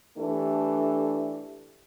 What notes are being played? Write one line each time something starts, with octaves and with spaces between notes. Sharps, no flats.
E3 A3 D4 G4 A4